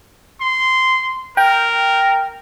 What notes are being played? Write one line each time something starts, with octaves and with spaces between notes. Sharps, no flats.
C6
A#4 G5